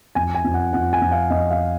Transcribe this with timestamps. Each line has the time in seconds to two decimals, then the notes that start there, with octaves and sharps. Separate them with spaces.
0.15 F2 G#5
0.35 G#5
0.44 F2
0.54 F#5
0.73 F2 F#5
0.93 G#5
1.01 F2
1.12 F5
1.30 F2 D#5
1.51 F5